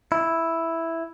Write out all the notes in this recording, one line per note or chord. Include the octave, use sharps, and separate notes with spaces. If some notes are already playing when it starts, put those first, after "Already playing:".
E4